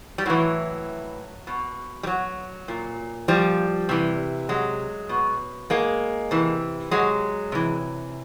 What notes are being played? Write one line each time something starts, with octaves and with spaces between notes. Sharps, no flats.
G3
A2 E3 F#3
B2
G3
F#3
A#2
F3 G3
C3 E3
F#3 G#3
B2
G#3 A#3
C3 E3
F#3 G#3
C3 E3